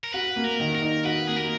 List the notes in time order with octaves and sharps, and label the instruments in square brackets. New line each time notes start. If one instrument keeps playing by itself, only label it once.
[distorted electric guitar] A#4
[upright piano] F#4 [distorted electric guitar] B4
[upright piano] A#3
[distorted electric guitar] A#4
[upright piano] D#3
[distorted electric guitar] A#4
[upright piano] D#4
[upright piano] F#4 [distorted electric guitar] B4
[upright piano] A#3 [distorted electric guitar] G#4
[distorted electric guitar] A#4